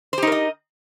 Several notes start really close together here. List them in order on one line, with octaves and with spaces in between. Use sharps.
C5 G4 D#4 A#4 D#5